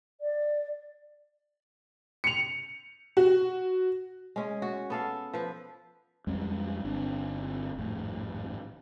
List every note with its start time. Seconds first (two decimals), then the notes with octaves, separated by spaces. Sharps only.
0.21 D5
2.24 C#7 F7
3.17 F#4
4.36 G#3 C#4
4.62 F#4
4.90 B3 A4 F5
5.33 F3 B4
6.27 F2 G3 G#3 C#4
6.84 G1 C4 D4
7.77 G#1 F2 A2